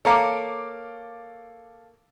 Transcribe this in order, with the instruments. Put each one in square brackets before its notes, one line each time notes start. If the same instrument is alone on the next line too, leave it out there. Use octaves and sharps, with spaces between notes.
[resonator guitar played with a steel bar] A#3 C#5 [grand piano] A4 F5 D6